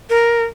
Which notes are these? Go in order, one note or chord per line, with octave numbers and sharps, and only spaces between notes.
A#4